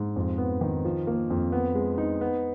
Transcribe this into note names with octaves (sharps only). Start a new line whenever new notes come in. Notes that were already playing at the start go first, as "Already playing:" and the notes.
Already playing: G#2
F2
B3
D#3
F3
A#3
F2
B3
G#3
D#4
B3